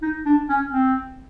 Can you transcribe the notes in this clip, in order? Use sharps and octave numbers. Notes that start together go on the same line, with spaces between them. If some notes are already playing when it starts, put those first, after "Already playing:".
D#4
D4
C#4
C4